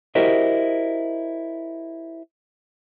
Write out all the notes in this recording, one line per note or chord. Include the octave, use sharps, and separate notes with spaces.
E4 F#4 G4 A#4 C5 D#5